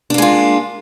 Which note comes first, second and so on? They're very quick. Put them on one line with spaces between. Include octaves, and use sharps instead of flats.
D4 A#3 G#3 F4